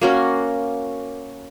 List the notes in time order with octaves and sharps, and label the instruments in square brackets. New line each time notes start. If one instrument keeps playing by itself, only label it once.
[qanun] A#3 C#4 F#4 A#4